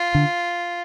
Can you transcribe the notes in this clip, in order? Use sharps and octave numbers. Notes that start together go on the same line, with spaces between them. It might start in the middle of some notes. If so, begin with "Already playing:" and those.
Already playing: F4
D3